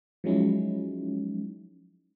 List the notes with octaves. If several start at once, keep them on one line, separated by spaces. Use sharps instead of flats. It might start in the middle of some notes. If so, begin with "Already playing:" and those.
F3 F#3 G#3 C#4 D#4 E4